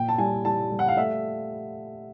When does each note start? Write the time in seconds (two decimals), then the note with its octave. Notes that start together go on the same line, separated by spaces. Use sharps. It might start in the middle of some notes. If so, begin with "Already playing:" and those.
Already playing: A#2 G5
0.09 A5
0.18 G3 G#5
0.45 G3 A5
0.71 G3
0.79 F#5
0.88 F5
0.97 A3 E5